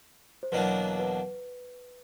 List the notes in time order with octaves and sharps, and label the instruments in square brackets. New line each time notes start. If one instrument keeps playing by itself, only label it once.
[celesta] C5
[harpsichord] E2 B2 F#3 A#3 D4 [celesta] B4
[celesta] B4